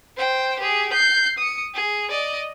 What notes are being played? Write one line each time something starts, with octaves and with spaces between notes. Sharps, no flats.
C5 G5
G4 G#4
G6 C7
D#6 C#7
G#4
D5 D#5